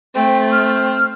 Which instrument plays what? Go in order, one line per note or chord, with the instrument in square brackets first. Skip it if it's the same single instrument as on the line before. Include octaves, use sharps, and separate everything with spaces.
[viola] A3 [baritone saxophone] C4 [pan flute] G5
[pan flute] F6